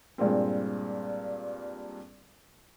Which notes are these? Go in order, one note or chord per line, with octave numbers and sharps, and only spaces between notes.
G2 A#2 G#3 C4